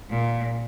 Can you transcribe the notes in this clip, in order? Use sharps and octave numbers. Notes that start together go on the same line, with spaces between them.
A#2